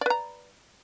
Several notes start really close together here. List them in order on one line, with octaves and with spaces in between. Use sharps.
D5 B4 A#5